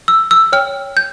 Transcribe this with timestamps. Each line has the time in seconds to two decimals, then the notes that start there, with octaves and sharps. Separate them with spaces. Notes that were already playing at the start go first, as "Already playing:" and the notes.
0.08 E6
0.31 E6
0.52 C#5 G5 F6
0.97 G6